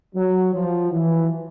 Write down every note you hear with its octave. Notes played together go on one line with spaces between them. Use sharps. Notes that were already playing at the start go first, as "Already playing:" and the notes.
F#3
F3
E3